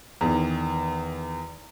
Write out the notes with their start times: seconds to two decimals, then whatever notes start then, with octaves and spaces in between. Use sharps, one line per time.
0.21 E2 D#3